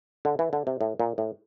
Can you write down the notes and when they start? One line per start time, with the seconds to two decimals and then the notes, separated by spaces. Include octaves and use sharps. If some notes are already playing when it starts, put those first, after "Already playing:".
0.25 D3
0.39 E3
0.53 D3
0.67 C3
0.81 A2
1.00 A#2
1.18 A2